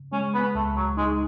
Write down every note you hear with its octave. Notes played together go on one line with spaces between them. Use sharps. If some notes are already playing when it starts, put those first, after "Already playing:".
Already playing: C#3
G#3 C#4
B3
C#2 A3
F#3
G#3 D#4